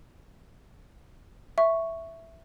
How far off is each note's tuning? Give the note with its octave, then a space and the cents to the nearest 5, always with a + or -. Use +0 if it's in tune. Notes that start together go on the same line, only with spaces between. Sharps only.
E5 +0 C#6 +0